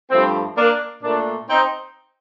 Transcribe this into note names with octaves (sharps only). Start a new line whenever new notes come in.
G2 F3 A3 C4
A#3 D4
A#2 A3 A#3 D4
C4 D#4